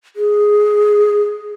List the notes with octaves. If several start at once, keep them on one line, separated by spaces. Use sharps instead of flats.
G#4